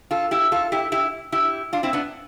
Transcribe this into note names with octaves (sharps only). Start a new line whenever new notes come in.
F4 A4
E4 G4
F4 A4
E4 G4
E4 G4
E4 G4
D4 F4
C4 E4
B3 D4